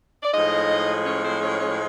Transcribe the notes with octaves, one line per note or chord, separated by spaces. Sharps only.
D5
A2 F3 G#3 D#4 D#5
C#4 C#5
C4 C5
C#4 C#5
C#4 C#5